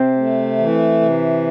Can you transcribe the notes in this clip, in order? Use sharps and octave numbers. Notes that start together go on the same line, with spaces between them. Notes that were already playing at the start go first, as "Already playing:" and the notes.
Already playing: C3 C4
A3
E3
C3